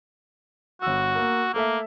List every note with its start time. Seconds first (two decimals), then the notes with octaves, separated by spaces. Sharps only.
0.82 G1 F#4 E6
1.15 A#3 A#4
1.54 A3 A#3 A4 E5